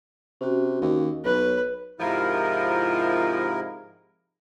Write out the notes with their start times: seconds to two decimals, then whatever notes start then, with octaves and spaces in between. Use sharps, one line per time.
0.41 C3 C#4 F#4
0.81 D#2
1.25 B1 B4 C#5
2.00 G#2 C3 F3 E4 A#4